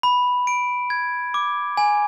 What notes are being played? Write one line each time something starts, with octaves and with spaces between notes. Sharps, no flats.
B5
D7
G#6
D6
G#5